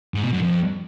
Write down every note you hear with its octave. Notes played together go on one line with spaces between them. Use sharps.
G#2
B2
F#2
F2